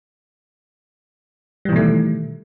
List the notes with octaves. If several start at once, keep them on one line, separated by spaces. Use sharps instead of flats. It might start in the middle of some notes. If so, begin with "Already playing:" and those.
B2 D#3 E3 G3 A3